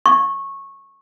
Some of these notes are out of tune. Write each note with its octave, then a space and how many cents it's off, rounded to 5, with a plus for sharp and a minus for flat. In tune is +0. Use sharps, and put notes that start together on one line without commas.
C#6 -15